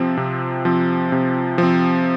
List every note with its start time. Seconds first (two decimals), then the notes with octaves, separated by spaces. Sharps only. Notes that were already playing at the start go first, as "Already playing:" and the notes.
Already playing: C3 F3 C4
0.17 C3
0.65 F3 C4
1.12 C3
1.58 F3 C4